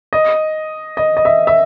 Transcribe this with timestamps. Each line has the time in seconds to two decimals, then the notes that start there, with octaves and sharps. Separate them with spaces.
0.13 D#5
0.97 D#5
1.17 D#5
1.25 E5
1.47 E5